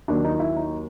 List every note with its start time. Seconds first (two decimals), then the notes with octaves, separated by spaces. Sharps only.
0.08 D#2 D#3 F#3 D4
0.24 D#4
0.35 D#4
0.40 E4
0.57 D#4